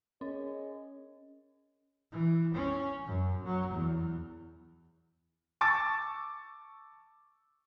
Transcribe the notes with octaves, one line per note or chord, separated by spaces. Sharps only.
C#4 G#4 C#5 D#5
E3
C#4
F#2
F#3
E2
A5 C#6 D6 E6 A6